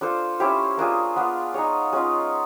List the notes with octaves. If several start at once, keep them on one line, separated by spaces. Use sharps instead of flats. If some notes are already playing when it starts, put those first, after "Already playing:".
D4 F4 A4 C5
C#4 E4 G4 C5
A#3 D4 F4 G#4
B3 D4 F4
D#4 G#4 C#5
G#3 C#4 F4